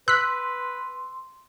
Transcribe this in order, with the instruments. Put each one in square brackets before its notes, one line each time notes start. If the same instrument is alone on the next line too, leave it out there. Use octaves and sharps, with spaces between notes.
[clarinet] B4 [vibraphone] C6 [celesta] E6 [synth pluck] F#6 B6